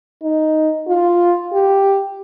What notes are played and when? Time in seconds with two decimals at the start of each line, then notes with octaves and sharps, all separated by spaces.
0.23 D#4
0.88 F4
1.53 G4